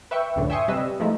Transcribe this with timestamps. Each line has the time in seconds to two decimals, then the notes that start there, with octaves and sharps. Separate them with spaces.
0.11 B4 E5 G5 C#6
0.36 C#2 F#2 A2 D3
0.50 E5 G5 G#5 C6 C#6 D#6
0.68 C3 G3 B4 D#5 E6
1.00 F3 G#3 A3 D#4 E4